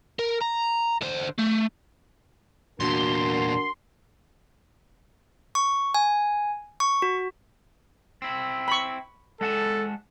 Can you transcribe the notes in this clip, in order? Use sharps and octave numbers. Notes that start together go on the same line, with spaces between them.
A#4
A#5
D3 C5
A3
E2 A#2 D4 F#4 A#4 C6
C#6
G#5
C#6
F#4
C4 E4
B5 C#6
G#3 A4 F#5 A5